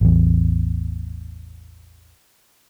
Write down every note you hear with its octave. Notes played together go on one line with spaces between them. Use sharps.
A1 E2